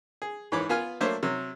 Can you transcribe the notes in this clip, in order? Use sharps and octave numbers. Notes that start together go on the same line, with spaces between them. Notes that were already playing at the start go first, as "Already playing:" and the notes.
G#4
G#2 E3 C#5 B5 D6
B3 F4 B4 G#5 F6
F#3 A3 A#3 D4 C5 C#5
C3 F#3